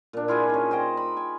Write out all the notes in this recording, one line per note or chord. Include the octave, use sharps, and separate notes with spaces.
A#2 D4
E4 F4 G#4 G#5
C#4 D#4
C5 D#5 G5 A#5
B5
G#5